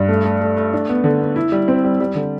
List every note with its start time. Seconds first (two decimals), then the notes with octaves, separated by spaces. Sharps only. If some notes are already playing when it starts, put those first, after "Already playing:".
Already playing: G2
0.09 A3
0.25 A3
0.41 A3
0.57 A3
0.73 D4
0.89 B3
1.04 D3
1.21 B3
1.36 E4
1.52 G3
1.68 C4
1.84 G3
2.00 G3
2.15 D3